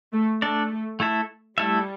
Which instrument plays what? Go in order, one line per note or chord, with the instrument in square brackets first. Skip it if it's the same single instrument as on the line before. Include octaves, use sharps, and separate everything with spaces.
[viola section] A3
[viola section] A3 [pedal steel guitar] D4 A4 D5
[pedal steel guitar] A3 E4 A4 E5
[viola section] G3 [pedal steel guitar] A3 E4 A4 E5